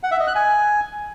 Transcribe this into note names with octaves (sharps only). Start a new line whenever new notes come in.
F#5
E5
D#5
F#6
G#5